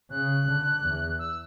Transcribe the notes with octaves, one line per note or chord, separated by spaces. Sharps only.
C#3 F#6
D3
E2
E6